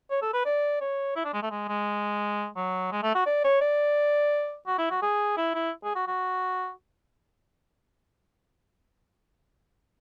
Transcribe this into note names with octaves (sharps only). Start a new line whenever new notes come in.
C#5
A4
B4
D5
C#5
E4
D4
G#3
A3
G#3
G#3
F#3
G#3
A3
F#4
D5
C#5
D5
F#4
E4
F#4
G#4
E4
E4
G#4
F#4
F#4